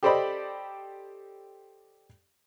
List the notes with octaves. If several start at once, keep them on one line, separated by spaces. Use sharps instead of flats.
G4 A4 C5 D5 D#5 B5